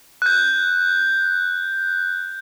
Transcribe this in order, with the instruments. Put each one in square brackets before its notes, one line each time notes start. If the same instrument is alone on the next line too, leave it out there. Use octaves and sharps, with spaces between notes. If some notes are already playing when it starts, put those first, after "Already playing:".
[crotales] F#6 G6